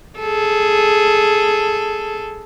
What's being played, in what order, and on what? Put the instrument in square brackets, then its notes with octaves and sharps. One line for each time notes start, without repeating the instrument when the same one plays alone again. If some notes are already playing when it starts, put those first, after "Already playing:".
[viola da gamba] G#4 A4